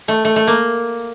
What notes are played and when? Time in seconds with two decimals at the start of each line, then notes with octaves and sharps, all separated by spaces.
0.08 A3
0.25 A3
0.36 A3
0.47 A#3